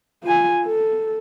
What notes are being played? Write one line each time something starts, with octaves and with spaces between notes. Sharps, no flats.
F4 G#5
A4